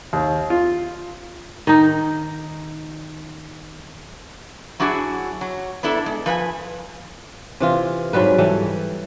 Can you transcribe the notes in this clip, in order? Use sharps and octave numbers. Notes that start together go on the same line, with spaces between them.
D#2
F4
D#3 D#4
F#3 D4 E4 F#4 G#4
F#3
B3 D4 E4 A4
G#3
F3 B4 F#5 G#5
C3 E3 F4
G#2 F#3 G3 B4
E3 G3 A4